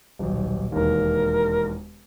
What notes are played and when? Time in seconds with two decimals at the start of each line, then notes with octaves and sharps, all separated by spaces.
0.19 D#1 B1
0.72 E1 D#2 A#4